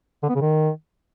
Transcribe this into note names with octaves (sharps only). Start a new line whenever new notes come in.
D3
B3
C#3
D#3